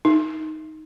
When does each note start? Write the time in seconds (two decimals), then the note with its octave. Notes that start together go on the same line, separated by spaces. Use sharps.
0.05 D#4